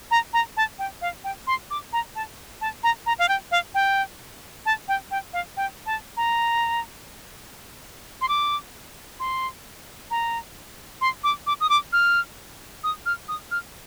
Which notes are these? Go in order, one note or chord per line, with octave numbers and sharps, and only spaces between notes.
A#5
A#5
A5
G5
F5
G5
C6
D6
A#5
A5
A5
A#5
A#5
F5
G5
F5
G5
A5
G5
G5
F5
G5
A5
A#5
C6
D6
C6
A#5
C6
D6
D6
D#6
D6
F6
D#6
F6
D#6
F6